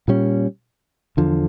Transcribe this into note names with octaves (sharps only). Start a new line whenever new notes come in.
A#2 G3 C#4
E2 D3 F3